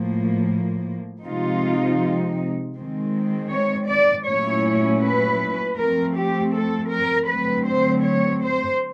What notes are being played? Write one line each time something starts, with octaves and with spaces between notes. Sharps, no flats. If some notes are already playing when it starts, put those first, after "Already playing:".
Already playing: A2 F3 A#3
C3 F3 G#3 C4 D#4 F4
D#3 G#3 C4
C#5
D5
A#2 F#3 A3 C#4 E4 C#5
B4
F3 A3 C4 A#4
G4
A4
A#4
D3 F#3 A3 C4 B4
C5
C#5
C5